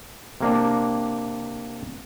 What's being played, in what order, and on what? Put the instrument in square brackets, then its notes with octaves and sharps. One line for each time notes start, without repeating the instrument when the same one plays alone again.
[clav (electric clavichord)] C3 A#3 D4